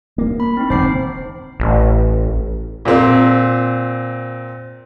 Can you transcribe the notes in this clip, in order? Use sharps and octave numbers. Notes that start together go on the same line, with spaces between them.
A#3
B5
C4 D#4
E1 D3 C5 D6 C7
A1
A#2 C4